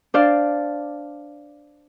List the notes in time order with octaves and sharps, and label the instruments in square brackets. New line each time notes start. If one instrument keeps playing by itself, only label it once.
[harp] D4 C5 D5 F5